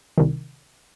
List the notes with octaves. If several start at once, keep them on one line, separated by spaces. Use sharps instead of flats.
C2 D#3